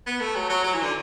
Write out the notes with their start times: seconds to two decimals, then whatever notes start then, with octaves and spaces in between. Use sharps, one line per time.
0.07 B3
0.20 A3
0.36 F#3
0.50 F#3
0.64 F#3
0.74 E3
0.83 D3